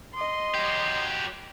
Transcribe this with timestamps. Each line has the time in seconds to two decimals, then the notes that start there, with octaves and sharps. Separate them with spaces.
0.14 D#5 C6
0.55 F#3 G4